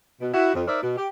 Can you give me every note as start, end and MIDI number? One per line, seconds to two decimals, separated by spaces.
0.21 0.30 47
0.33 0.54 64
0.33 0.54 66
0.54 0.63 41
0.67 0.82 63
0.67 0.82 70
0.67 0.82 72
0.67 0.82 74
0.67 0.82 76
0.82 0.94 47
0.97 1.06 67